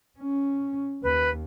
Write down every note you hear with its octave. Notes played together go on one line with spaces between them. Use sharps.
C#4
D#2 B4